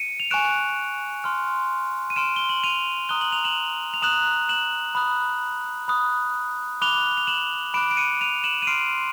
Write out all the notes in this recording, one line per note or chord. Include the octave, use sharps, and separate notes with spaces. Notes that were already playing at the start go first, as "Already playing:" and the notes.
Already playing: C#7 D#7
F7
G#5 C#6 F#6 D7 E7
C6 F6
D#7
C6 F6 D7 E7
G7
F#7
D#7 F7
A#5 D#6 F#6 G7
F#7
F7
E7 F#7
F7
A#5 D#6 F#6 E7 F#7
E7 F#7
B5 D#6 F#6
B5 D#6 F#6
B5 D6 F#6 F7 G7
F7
E7 F#7
B5 D6 F#6 D7 E7
D7
C#7 D#7
D#7 F7
E7 F#7
D#7
C6 F6 C7 D7